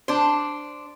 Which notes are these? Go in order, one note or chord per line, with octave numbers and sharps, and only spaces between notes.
D4 C5